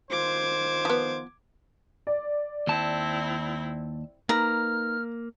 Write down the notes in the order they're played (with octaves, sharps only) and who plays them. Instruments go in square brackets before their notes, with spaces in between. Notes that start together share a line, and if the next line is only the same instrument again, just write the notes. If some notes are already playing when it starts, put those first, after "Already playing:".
[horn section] D#3 F4 C5 [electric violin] D6 G#6
[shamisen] F3 B3
[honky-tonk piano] D5
[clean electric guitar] D#2 A5 [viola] C4 E4
[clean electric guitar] A#3 [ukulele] D#4 B4 [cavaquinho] A#5 [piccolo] F6